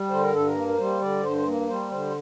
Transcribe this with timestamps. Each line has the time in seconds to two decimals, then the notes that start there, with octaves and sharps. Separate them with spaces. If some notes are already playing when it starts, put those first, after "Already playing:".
Already playing: G3
0.09 D3 C5
0.22 A#4
0.32 G2 A4
0.47 A#4
0.55 A#3
0.69 A#4
0.77 G3 C5
1.01 D3 D5
1.23 G2 C5
1.46 A#3
1.68 G3 C5
1.91 D3 C5